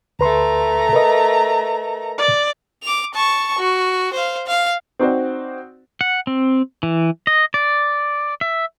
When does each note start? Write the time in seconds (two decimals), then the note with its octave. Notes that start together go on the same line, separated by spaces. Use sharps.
0.19 D2 A3 B4 A#5 C6
0.93 A#4 B4 D#5
2.18 D5
2.83 D6 F7
3.14 A5 C#6
3.58 F#4
4.14 C5 F5
4.47 F5
4.99 C4 D#4 F#4 C5 D5
6.01 F#5
6.27 C4
6.83 E3
7.27 D#5
7.54 D5
8.41 E5